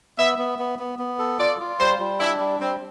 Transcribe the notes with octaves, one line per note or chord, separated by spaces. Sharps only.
B3 E5
B3
B3
B3
B3
A4
F4 D5
F4
G3 C5
G3
D4 E4
G3
G3 C4